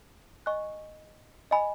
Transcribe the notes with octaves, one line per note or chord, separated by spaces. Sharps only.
D#5 G#5 C#6 F#6
D#5 G#5 B5